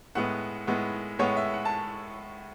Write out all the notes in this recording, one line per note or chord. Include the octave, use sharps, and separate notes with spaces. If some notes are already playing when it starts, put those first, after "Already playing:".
A2 G#3 B3 F#5
A2 G#3 B3
A2 G#3 B3 C#5
E5
F#5
A5